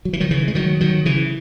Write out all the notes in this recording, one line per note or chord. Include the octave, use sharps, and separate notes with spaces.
F#3
E3
D#3 F#3
C#3 E3
G#3
D#3 F#3
D#3 F#3
C#3 E3